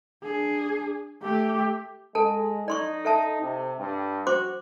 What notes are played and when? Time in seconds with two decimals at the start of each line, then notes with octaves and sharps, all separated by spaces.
0.23 D4 G#4
1.22 A3 G4
2.15 G#3 A4 A5
2.68 D#4 D5 C6 C#6
3.05 A4 E5 A5
3.41 C3
3.79 G2
4.27 F#4 C5 C6 D6